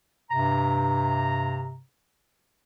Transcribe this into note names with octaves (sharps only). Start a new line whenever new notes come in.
G2 C3 A#5